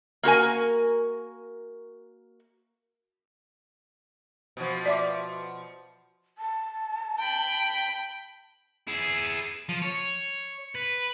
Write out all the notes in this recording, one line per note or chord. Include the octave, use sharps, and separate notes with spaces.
A#3 F#4 A#4 G#5
B2 F3
D5 E5 D6
A5
G5 B5
E4 G#4
F3
C#5
B4